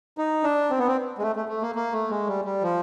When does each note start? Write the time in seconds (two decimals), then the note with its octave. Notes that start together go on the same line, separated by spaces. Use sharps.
0.18 D#4
0.44 D4
0.70 C4
0.79 B3
0.87 C4
1.18 G#3
1.22 A3
1.36 A3
1.49 A3
1.62 A#3
1.75 A#3
1.92 A3
2.10 G#3
2.27 G3
2.45 G3
2.63 F3